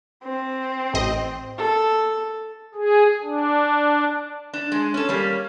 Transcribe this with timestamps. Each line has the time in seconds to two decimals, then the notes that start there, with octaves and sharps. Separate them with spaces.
0.24 C4
0.94 A1 D#5
1.58 A4
2.75 G#4
3.22 D4
4.53 D4
4.72 G#3
4.94 C#4 A4
5.09 G3 A#3 C#4